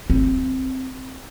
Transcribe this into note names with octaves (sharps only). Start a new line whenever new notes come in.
C4